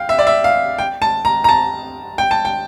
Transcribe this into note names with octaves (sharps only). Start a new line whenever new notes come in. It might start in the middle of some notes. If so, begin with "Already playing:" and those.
Already playing: F5 G5
E5
D5
E5
F5
G5
A5
A#5
A#5
A5
G5
A5
G5